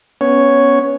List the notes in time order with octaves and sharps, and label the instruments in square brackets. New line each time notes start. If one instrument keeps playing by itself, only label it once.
[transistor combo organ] B3 C#4 C#5